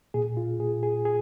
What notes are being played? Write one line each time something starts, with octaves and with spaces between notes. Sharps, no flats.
A#2 G#4
F4
A#2 G#4
G#4
G#4